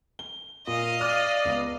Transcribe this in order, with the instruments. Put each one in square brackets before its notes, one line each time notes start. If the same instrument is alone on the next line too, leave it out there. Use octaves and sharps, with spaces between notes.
[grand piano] G7
[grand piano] A#2 [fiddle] D#5 F5
[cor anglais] D5 [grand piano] F6 D#7
[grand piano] C#2 B3